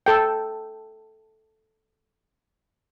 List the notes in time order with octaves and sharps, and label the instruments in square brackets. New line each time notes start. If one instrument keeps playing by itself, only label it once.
[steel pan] A4 G5